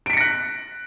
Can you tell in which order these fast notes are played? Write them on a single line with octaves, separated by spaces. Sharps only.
D7 B6 C#7 A#6 F#6